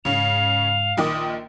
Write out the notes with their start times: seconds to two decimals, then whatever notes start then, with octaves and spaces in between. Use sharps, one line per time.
0.05 G#2 C#3 C#4 F5 F7
0.97 A#1 D#3 D6 D#6